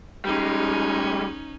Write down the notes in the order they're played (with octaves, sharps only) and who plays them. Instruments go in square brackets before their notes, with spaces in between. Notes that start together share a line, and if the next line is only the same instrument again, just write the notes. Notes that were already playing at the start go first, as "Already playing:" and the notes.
[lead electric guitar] G3 G#3 [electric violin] C#4 D#4